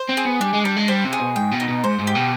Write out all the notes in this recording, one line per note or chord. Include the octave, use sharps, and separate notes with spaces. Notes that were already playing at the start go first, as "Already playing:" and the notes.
Already playing: C5
C4
G#4
B3
G3 D4
G#3
G3 D4
G#3
G3 C5
C3
G#4
B2
G#2 G5
B2
D#4
B2
G#2 C5
G#2
G4
B2